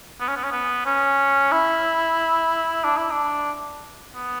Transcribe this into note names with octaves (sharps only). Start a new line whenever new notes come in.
B3
C#4
B3
C#4
B3
C#4
E4
D4
E4
D4
B3